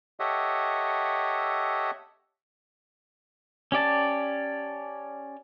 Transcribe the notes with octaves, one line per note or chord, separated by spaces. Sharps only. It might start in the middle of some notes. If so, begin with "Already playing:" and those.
G4 A4 C#5 D#5 E5 F#5
C#4 G4 D5 A5